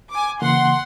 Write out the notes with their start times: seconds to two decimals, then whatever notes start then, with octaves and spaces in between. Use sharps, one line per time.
0.12 G#5 D6
0.42 C#3 E3 A#3 F#5 C6